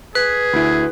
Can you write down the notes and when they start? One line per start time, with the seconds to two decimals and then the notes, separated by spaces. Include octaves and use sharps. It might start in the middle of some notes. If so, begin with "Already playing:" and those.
0.15 G#4 B4 F#6
0.53 D2 E4